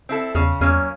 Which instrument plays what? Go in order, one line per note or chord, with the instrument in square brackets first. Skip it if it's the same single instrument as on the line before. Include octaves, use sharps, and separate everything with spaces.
[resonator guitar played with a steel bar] C4 E4 A4
[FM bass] E2 [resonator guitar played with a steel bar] C#3
[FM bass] E2 [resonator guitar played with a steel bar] F#3 A#3 C#4